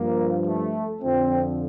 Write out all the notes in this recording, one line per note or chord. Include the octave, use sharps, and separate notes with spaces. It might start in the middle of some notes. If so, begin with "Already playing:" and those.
Already playing: G2 F3 A#3
A3
F2 D3 F3 C4